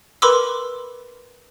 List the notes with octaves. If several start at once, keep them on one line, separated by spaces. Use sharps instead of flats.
A#4 B4 B5 C6 D6 E6